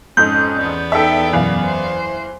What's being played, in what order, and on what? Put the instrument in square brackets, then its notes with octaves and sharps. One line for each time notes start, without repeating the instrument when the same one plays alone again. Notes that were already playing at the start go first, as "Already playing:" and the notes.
[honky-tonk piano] F2 G#2 [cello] C#4 [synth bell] G6
[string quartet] E2 B3 D5
[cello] D#4 G5 [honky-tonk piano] A4 E5
[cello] F#2 B2 [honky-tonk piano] E3 F5
[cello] C5